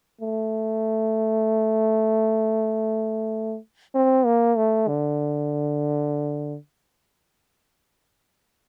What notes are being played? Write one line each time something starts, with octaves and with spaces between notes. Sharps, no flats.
A3
C4
A#3
A3
D3